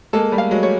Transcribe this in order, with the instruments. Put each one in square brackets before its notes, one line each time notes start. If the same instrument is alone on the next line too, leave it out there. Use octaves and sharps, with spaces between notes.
[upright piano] G#3 A#3 [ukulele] A4
[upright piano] G3 A3
[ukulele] F5
[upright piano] F#3 G#3
[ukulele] C#5